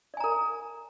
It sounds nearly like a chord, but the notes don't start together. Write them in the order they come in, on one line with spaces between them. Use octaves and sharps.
D5 G#5 A#5 A#4